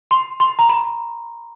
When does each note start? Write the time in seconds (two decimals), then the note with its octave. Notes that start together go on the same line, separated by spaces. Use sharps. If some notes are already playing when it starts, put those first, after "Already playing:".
0.11 C6
0.40 C6
0.59 A#5
0.69 B5